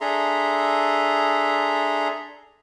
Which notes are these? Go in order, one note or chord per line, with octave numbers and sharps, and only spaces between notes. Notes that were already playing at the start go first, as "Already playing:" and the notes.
D4 G#4 A4 E5 A#5 C6